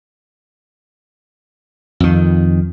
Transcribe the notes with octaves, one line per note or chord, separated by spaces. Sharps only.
F2 D#3